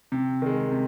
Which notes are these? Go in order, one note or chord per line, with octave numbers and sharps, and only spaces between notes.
C3
D#3 G#3
C3